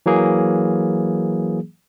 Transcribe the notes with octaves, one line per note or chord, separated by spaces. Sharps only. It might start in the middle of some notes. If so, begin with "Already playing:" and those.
E3 F#3 A#3 G#4